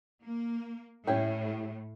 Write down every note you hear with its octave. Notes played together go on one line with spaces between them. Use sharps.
A#3
A2 C#4 E4 G4